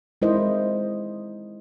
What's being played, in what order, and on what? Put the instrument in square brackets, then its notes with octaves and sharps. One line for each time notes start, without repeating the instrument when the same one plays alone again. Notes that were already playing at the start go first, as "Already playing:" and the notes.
[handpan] G#3 D#4 E4 A#4 C5 D#5